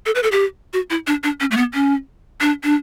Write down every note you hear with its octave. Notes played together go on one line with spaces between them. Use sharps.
A4
B4
A4
G4
F#4
E4
D4
D4
C#4
A3
B3
C#4
D4
D4